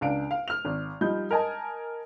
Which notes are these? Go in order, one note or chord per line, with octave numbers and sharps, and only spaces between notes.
C#2 D4 F5 D7
F5
F6 F7
G#1
F3 G3 D#4 G6
A#4 D#5 G#5 A5